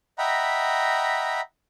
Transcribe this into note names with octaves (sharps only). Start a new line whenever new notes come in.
D#5 E5 F#5 G5 A#5 B5